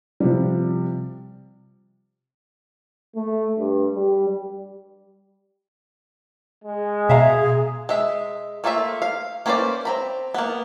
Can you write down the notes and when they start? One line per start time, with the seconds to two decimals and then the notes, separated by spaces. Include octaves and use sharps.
0.20 C3 F3 G3
3.16 A3
3.59 G2
3.95 G3
6.64 G#3
7.09 B2 G#4 E5 F5 A#5
7.89 G#3 E5
8.64 A3 A#3 F4 G#4 E5
9.02 F5
9.46 A#3 C#4 B4 C5 D5
9.85 C4 A#5 B5
10.34 A#3 B3